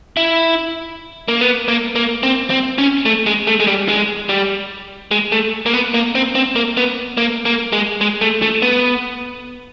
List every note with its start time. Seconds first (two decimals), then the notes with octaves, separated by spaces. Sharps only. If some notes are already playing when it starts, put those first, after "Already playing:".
0.17 E4
1.28 A#3
1.41 B3
1.68 A#3
1.96 A#3
2.23 C4
2.50 C4
2.78 C#4
3.06 A3
3.26 G#3
3.47 A3
3.60 G#3
3.67 G3
3.88 G#3
4.29 G3
5.11 G#3
5.32 A3
5.66 A#3
5.74 B3
5.94 A#3
6.15 C4
6.35 C4
6.56 A#3
6.77 B3
7.17 A#3
7.45 A#3
7.73 G#3
8.01 G#3
8.21 A3
8.42 A3
8.62 B3